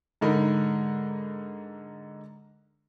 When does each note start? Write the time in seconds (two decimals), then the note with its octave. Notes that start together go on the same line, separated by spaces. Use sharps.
0.21 G#2 D3 D#4 A#4 B5